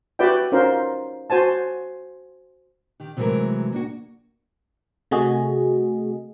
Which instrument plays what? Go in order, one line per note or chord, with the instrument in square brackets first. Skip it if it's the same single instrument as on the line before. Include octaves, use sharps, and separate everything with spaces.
[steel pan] F#4 G4 B4 D5 E5 G5
C#4 D#4 F4 A#4 C5
F#4 C5 G#5 A5
[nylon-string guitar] D#3 G4
C3 E3 F#3 G#3 A3 A#4
A#3 D4 F#4
[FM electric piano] C3 A3 F#4 G#4 D#5